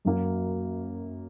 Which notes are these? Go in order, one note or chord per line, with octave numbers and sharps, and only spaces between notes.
F#2 F#3 A#3